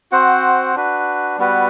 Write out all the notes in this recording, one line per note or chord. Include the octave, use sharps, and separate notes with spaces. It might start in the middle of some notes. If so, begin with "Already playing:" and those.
C4 F#4 C5 F#5
D4 F#4 B4
G3 B3 F#4 B4